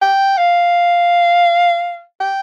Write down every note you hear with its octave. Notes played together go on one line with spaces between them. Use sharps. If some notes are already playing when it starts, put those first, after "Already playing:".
G5
F5
G5